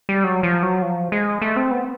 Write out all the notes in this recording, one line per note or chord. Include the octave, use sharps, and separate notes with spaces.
G3
F#3
F3
F#3
F3
G#3
A3
C4
B3